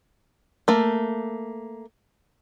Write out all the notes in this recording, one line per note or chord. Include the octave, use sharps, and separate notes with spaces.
A3 A#3